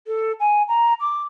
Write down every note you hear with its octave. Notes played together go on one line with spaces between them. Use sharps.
A4
G#5
A#5
D6